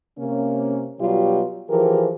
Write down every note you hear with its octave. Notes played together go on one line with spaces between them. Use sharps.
C3 A#3 C#4
B2 F#3 G3 F4 G4
E3 F3 G4 G#4 A#4